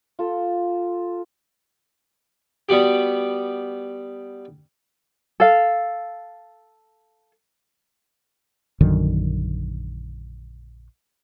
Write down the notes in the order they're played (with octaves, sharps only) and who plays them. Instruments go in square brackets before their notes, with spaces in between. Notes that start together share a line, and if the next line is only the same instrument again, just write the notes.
[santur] F4 A4
[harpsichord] G3 B3 F#4 G4
[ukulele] A4 F5
[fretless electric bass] A#1 F#2 D3 D#3